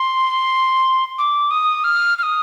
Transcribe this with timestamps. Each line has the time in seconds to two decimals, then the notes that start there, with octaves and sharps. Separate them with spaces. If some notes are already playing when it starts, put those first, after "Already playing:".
Already playing: C6
1.18 D6
1.51 D#6
1.84 F6
2.18 F6
2.23 D#6